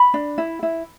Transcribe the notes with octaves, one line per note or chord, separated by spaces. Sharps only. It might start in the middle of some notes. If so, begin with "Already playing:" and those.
Already playing: B5
D4
E4
E4